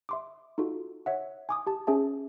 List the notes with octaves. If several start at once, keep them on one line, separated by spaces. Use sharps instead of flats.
E5 C6 D6
D#4 F4 F#4 A4
C#5 E5 F#5
G#5 D6 D#6
G4 A5
C#4 G#4 E5 A5